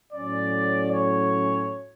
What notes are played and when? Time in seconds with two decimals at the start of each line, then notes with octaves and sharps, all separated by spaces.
0.12 A2 F#3 C#4 D5
0.93 C#5